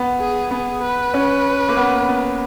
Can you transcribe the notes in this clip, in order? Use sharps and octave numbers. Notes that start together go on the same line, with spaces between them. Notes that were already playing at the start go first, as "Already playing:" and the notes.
Already playing: B3
G#4
B3 G#4
B4
C#4
A#3
B3
B3